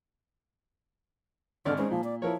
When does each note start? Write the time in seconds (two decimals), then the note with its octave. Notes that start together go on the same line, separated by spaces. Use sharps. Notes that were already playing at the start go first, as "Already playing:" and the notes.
1.65 G#1 D3 D5 F6
1.78 G#3 C4 C#4 D#4
1.91 A#2 F3
2.04 D5
2.22 F3 E4 A#4 C#5